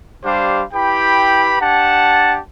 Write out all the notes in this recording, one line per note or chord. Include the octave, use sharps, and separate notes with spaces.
G3 D4 G4 C5 F5
E4 G4 B4 G5 B5
D4 G4 F#5 A5